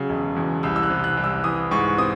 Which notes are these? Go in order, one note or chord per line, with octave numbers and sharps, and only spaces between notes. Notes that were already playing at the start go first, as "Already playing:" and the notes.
Already playing: C#3 F#3
E1
E2
C2 E6
E6
F#6
C3
F#6
C2
E6
E3 D#6
G#2 C#6
C4 D#6